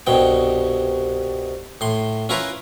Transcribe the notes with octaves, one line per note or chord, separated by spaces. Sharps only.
C2 G2 B2 G5
A2 C6
C#4 E4 F4 A#4 B4